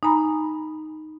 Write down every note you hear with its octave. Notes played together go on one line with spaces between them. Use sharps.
D#4 G#5 A#5 B5